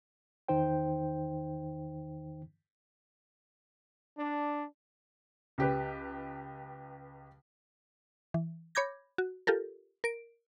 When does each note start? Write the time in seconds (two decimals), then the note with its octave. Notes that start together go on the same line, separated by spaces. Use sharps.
0.48 E2 D#3 D#4 C5 G5
4.18 D4
5.58 C#2 G4 B4
8.34 E3
8.75 C#5 B5 D6 G6 G#6 A#6
9.18 F#4
9.47 F4 G4 A4 A#4
10.04 A#4 D7